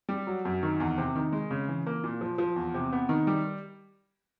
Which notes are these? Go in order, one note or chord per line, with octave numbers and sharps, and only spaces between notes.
G3
F#3
F#2
D#3
E2
C3
D#3
G#3
C#3
E3
A#3
A#2
F3
F3
E2
C3
B3
D#3
G3